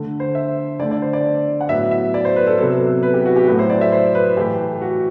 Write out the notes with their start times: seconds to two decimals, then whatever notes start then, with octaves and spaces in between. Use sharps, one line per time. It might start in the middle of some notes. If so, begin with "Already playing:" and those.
Already playing: D3 A3
0.20 C5
0.35 E5
0.79 D3 A3 D5
0.91 D5
1.02 C5
1.13 D5
1.61 F#5
1.69 A2 F#3 B3 E5
1.91 E5
2.14 D5
2.25 C5
2.36 B4
2.47 A4
2.58 C3 F#3 B3 A4
2.81 A4
3.03 B4
3.14 G4
3.26 F#4
3.36 G4
3.47 A2 F#3 A3 B4
3.59 C5
3.70 D5
3.81 E5
3.92 C5
4.15 B4
4.37 A2 E3 A3 G4
4.82 F#4